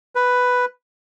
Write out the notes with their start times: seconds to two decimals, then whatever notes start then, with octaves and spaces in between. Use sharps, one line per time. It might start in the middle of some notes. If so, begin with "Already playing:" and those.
0.15 B4